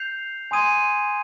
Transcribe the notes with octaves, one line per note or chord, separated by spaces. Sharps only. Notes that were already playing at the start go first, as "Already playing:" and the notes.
Already playing: G6 C7 F7
G#5 C6 D#6 G#6 D#7